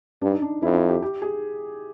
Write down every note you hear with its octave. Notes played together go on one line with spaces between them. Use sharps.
G2 D4
D#4
D4
F2 E4
E4
G4
G4
G#4